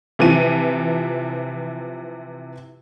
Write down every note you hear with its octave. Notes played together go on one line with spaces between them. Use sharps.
C3 E3 F3 D#7